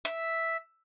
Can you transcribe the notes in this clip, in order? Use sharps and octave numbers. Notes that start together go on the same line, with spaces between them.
E5